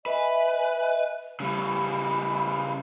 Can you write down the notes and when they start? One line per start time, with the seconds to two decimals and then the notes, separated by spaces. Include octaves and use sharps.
0.06 B4 D#5 E5 G#5
1.40 C#3 G3 B5